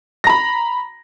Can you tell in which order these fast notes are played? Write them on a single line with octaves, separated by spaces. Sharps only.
A#6 A#5 B5